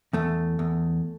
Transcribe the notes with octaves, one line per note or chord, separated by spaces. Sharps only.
E2 A3
E2